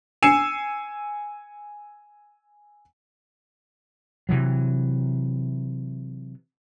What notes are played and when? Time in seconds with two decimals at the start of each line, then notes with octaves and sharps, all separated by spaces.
0.22 G#5 E6 C7 C#7 E7
4.29 C3 E3 F#3